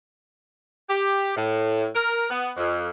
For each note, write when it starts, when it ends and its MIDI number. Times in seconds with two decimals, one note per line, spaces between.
0.89 1.33 67
1.36 1.87 45
1.95 2.26 70
2.30 2.51 59
2.57 2.88 41